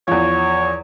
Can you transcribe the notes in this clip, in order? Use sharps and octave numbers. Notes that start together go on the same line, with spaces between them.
E2 F3 C#5